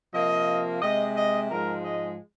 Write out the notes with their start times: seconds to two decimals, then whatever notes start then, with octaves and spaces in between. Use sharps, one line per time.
0.13 C3 F3 A#3 D#5
0.81 C3 G#3 D#5
1.15 D#5
1.49 G#2 F3 G#3 A#4
1.84 D#5